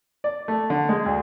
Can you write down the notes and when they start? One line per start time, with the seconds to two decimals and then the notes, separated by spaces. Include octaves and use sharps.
0.24 D5
0.48 A3
0.70 D3
0.89 G#3
1.06 D2